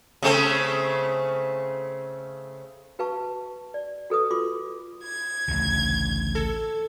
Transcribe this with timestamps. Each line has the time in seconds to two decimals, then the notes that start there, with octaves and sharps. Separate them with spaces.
0.23 C#3 A3 C4
2.99 F#4 B4 F5 A5 C#6
3.74 D5
4.10 F#4 A4 B4 D#6
4.31 F4 F#4 C6 D6
5.04 G#6
5.48 A1 D2 C#3
6.35 A4